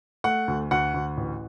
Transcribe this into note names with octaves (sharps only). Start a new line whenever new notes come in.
A3 F#5
D2
D2 F#5
D2
A1